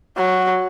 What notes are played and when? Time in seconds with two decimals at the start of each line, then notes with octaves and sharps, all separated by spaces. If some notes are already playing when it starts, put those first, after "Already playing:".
0.17 F#3